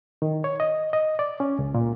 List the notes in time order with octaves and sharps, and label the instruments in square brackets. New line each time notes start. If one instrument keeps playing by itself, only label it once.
[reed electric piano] D#3
C#5
D#5
D#5
D5
C#4
C#2
A#2